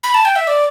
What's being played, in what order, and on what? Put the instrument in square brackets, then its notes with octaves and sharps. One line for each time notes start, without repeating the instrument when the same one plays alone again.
[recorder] B5
A5
G5
E5
D5